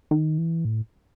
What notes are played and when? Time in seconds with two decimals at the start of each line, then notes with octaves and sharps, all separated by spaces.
0.11 D#3
0.38 E3
0.65 A2